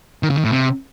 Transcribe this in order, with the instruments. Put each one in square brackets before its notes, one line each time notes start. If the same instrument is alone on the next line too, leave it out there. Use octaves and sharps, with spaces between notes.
[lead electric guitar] D#3
C#3
D#3
A2
C3